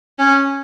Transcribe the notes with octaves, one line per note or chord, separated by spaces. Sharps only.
C#4